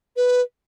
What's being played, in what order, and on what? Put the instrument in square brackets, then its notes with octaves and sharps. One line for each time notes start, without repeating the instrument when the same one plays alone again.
[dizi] B4